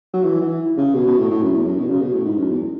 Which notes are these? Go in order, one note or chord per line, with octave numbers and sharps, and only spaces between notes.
F#3
E3
E3
C#3
B2
B2
A2
A2
F#2
E2
F#2
B2
C#3
B2
A2
G#2
F#2
E2